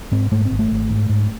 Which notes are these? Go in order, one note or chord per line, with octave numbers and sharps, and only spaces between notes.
G#2 C4
G#2 A3
C4
G#1
A3
G#1
G#2
G#2